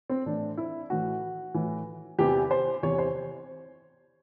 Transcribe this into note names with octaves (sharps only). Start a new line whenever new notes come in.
C4
A2 E3 D4
E4
A2 E3 F#4
A2 E3
E2 C3 E3 G4
C5
E2 C3 E3 C#5
C5